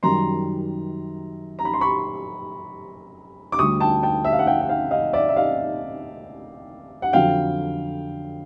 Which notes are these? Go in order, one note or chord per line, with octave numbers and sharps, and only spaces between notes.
F#2 D#3 G3 A#5 C6
A#5
B5
C6
B5 C#6
D6
D2 D3 G3 C#6 D#6
G5 A5
G5 A5
E5
F5
F#5
F5 G5
F#5
F5 G5
D#5 F5
D5 E5
E5
D#5 F5
F#5
F2 D3 F#3 F5 G5